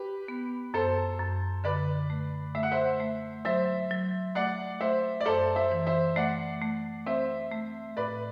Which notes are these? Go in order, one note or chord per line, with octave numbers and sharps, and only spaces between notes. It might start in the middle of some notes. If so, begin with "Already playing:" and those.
Already playing: G4 B4
B3
F#2 A4 C5
F#2
D3 B4 D5
A3
A3 E5
F#5
C5 E5
A3
F#3 C5 E5
F#3
A3 D5 F#5
A3 C5 E5
D5
F#2 A4 C5
C5 E5
E3
C5 E5
A3 D5 F#5
A3
C4 C5 E5
A3
A2 B4 D5